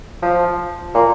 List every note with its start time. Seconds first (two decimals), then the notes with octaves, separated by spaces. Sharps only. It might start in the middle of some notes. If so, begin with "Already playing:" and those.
0.22 F3
0.95 A#2